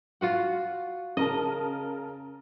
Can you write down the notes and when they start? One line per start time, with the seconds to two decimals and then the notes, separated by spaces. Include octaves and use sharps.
0.21 F4 F#4 F#5
1.17 C#3 A#4 D#5 A5